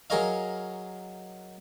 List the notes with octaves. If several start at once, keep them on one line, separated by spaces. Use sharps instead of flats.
F#3 G#4 A#4 C#5 D#5 F5